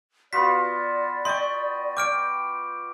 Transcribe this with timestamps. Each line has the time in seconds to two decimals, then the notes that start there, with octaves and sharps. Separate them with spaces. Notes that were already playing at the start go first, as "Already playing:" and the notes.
0.33 B3 F4 F#4 D5 B6
1.25 D#5 G5 C6 C#6
1.97 G5 D6 F6 D7